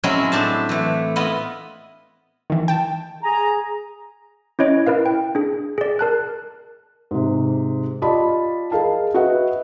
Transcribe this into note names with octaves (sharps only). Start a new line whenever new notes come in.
F#3 G#3 C4 C#4 E4
A2 D4 C5 A5
E3 A3
B3 E4 F4 D#5
D#3 E3
G5 A5
G#4 G#5 A#5
C#4 E4 C#5 D#5 D7
E4 A#4 B4 F5
G5
D4 G#4
G#4 D5
A#4 A5 F#6
G#2 C3
F4 G4 D5 D#5 A5 B5
G#4 A#4 D#5 F5 A5
F#4 B4 D#5 E5 F#5